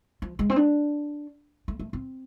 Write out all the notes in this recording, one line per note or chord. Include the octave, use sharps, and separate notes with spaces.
F3
G#3
C4
D4
A3
A3
C4